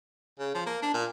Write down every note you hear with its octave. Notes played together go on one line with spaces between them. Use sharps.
C#3
F3
A#3
D4
A#2